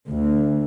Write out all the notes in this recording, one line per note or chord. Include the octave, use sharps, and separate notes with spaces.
D2